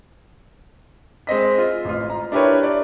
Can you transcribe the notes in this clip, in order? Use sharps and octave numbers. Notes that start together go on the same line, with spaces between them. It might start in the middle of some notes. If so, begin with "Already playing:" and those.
G#3 C4 D#5 B6
F4
A1 F4
A#5
D4 E4 G4 A#4 B4 C#5
D5